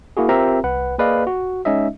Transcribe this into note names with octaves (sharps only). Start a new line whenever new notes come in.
A#3 E4 F#4 G#4
C4 F4 G4 A#4 E5 A#5
C2 B4 F#5
A#3 G#4 B4 D5 D#5 F5
F#4
G#3 C#4 D#4 D#5 E5